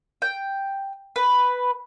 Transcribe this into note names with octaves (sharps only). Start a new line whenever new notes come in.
G5
B4